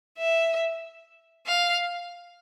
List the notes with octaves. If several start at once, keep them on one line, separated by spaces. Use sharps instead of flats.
E5
F5